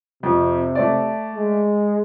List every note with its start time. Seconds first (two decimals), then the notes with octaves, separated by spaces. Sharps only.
0.23 F2 C3
0.75 A3 D5
1.35 G#3